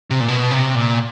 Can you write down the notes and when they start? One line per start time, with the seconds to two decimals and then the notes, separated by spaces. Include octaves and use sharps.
0.10 C3
0.20 A#2
0.28 B2
0.51 C3
0.75 A#2